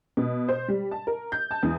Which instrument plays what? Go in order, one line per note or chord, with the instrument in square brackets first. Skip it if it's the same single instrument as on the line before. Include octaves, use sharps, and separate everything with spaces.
[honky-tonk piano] B2
C5
G3
A5
A#4
G6
A5
E2